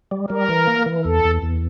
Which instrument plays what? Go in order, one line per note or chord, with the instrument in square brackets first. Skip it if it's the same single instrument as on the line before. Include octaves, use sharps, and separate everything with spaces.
[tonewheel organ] G3
[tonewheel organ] G3 [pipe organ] A#4
[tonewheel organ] E3
A#3
E3
[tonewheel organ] E2 [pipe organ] A4
[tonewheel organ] E2
E2